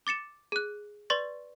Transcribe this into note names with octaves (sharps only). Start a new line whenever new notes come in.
D6 A6 C#7 E7
G#4 F#6
B4 D5 C6 C#6 A6